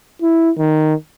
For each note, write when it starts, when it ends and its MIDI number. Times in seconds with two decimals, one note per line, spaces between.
0.22 0.51 64
0.59 0.94 51